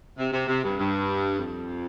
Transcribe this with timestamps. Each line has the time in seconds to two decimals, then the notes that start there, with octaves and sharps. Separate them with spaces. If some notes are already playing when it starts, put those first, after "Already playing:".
0.17 C3
0.32 C3
0.47 C3
0.63 G2
0.78 G2
1.39 F2